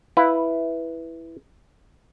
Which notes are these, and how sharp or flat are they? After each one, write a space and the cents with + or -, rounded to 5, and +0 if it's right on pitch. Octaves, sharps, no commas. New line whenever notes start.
E4 +0 B4 +0 F5 +0